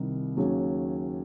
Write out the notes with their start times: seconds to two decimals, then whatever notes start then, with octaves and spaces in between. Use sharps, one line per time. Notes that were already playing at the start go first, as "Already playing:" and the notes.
Already playing: C2 C3 D#3
0.37 D#2 C#3 F#3 C#4 G#4